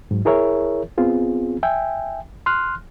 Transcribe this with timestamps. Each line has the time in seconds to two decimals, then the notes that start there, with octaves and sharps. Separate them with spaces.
0.11 G#2 F#3
0.25 E4 G#4 A#4 C#5 E5
0.98 B3 C4 F4 G#4
1.63 E5 G5 G#5
2.46 C6 F6 F#6